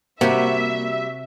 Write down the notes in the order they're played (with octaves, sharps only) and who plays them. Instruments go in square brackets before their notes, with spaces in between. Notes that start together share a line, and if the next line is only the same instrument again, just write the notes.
[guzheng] C3 G4 [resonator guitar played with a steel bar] G3 F#4 [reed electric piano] A#3 [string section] E5